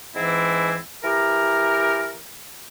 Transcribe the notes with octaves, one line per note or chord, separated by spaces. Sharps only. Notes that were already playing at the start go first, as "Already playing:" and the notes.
G#2 E3 C4 E4
E3 G4 A#4